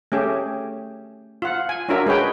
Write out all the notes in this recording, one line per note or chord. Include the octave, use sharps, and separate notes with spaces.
A3 C#4 G4 G#4
F4 F#5
G#5
C#4 D4 F4 F#4 A#4 E5
G#3 G#4 B4 C#5 G5